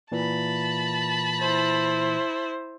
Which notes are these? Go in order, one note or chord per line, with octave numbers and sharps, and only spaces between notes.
A#2 E3 A5 B5
E4 C5